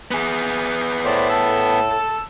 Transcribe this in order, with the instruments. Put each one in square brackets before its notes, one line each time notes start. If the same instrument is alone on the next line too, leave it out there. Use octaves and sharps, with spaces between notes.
[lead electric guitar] B3 G#4
[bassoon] A2 [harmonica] C5 D5
[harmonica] A5 E6